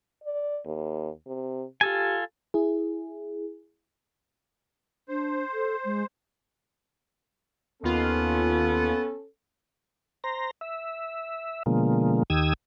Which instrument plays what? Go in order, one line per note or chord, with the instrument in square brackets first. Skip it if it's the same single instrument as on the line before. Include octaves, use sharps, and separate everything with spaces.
[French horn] D5
D#2
C3
[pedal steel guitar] F4 A4 G#5 [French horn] G4
[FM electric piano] E4 G#4
[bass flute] D4 [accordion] C5
[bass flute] A4
G#3
[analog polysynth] D#2 F4 [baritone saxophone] B3 [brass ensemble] C#4 A4
[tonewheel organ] C5 A#5
E5
B2 D3 F3 G#3 A#3
D#2 D#3 G4 D#6 E6 G#6